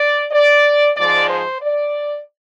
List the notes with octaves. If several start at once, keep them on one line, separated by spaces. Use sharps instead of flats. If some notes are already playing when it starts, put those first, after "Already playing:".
Already playing: D5
D5
G#2 F3 G#3 D5
C5
D5